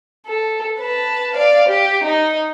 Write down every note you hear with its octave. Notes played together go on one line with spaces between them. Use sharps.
A4
B4 A5
D5 F5
G4
D#4 D#5